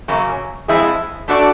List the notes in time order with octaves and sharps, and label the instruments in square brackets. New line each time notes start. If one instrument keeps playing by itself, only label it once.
[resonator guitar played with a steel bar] F#2 C#3 F#3 A#3
F3 G#3 C4 E4 G#4
A3 D4 F#4 A4 D5